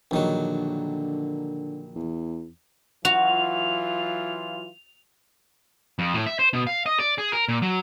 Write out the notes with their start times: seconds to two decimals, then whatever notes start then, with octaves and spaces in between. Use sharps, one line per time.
0.11 A#1 D3 D#3 F#3
1.96 E2
3.05 E3 F#3 F4 F#4 F7
5.99 F2
6.14 A2
6.26 E5
6.39 C5
6.53 B2
6.67 F5
6.86 D#5
6.99 D5
7.18 G#4
7.32 A#4
7.48 A#2
7.62 F#3